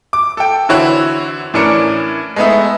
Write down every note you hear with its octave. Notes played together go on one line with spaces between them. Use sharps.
D6
A4 G5
D3 E3 C4 E4 F#4 C#5
A2 E3 C#4 D4 A#4 C#7
G#3 A3 B3 D#4 E5